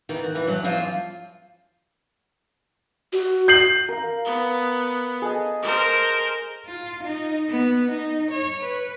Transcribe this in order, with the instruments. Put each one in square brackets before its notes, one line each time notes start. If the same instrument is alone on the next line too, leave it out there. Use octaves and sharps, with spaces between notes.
[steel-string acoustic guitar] D#3 E3
F#4
E3
G2 F#3
E2 F3 F4 C5
[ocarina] F#4
[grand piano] G6 C7 F#7
[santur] A#4 F5
[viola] B3
[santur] G#4 A4 D#5
[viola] A#4 C5
[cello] F4
D#4
B3
D#4
C#5
B4